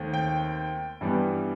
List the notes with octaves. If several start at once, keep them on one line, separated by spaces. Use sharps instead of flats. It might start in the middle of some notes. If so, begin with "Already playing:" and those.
Already playing: D#2 D#3 A3 C4
G5
G2 E3 G3 B3